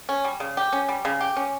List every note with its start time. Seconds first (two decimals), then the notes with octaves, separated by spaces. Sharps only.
0.09 C#4
0.25 G3
0.40 C#3
0.57 G4
0.73 C#4
0.89 G3
1.05 C#3
1.21 G4
1.37 C#4